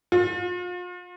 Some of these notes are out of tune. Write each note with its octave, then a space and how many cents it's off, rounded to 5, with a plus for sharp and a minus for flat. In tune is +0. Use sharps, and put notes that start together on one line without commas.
F4 +35